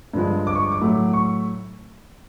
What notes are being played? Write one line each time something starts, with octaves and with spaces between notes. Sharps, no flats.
G2 D3 F3 G#3
D6
C#6
D6
A2 F#3 A3
C#6